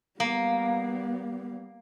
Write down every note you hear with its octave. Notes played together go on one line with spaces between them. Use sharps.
G3 A#3 B3